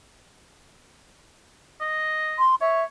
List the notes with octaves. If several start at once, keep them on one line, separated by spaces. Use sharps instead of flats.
D#5
C6
C#5 E5